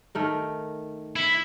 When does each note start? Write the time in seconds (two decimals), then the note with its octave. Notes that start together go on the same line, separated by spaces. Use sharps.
0.15 D#3 A3 A#4
1.16 E4